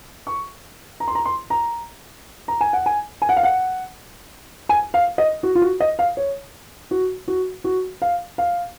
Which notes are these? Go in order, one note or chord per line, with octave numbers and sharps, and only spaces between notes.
C#6
A#5
C6
A#5
C6
A#5
A#5
G#5
F#5
G#5
G#5
F#5
F5
F#5
G#5
F5
D#5
F#4
F4
F#4
D#5
F5
C#5
F#4
F#4
F#4
F5
F5